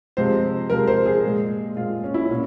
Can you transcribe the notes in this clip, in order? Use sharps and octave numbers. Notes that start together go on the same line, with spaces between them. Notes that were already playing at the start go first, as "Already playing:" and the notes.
C3 F3 G#3 C5
C3 F3 G#3 A#4
C5
G#4
A#2 G#3
A#2 G#3 F4
C#4
E4
A#2 C#4